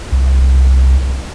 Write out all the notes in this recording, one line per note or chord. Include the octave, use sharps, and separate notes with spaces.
C2